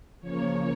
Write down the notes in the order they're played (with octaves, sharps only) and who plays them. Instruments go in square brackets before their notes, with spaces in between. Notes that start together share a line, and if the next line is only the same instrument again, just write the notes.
[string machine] C#3 F3 A#3 C#5